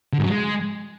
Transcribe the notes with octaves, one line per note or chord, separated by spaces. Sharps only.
D3
G#2
F#3
G#3